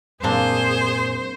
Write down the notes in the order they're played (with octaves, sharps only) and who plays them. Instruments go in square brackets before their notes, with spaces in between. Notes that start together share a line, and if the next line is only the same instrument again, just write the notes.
[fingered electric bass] F#2 A#2 [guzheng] A#3 C4 D4 [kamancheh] G#4 [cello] C5